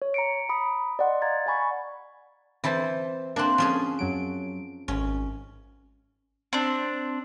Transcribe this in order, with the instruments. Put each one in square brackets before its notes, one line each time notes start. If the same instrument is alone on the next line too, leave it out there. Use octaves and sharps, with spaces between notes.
[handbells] C#5
A#5 C#7 D7
A#5 B5 D#6
D5 D#5 F#5 C6
F5 A#5 G#6 A6
D5 F#5 G#5 B5 C#6
[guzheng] E3 E4 A5 [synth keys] C4 C5
[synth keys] A#3 F#6 [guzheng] C4 D4
[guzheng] F3 C#4 G#4
[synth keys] F#2 F#3 D7
[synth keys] G#1 [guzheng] C#4
[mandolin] C4 D4